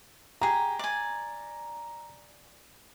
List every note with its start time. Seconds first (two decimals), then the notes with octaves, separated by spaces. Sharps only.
0.42 G4 G#4 A#5
0.79 D5 G#5